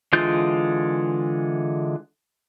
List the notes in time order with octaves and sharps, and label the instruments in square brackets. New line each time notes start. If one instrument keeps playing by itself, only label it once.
[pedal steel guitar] D3 E3 G#3 F4 G6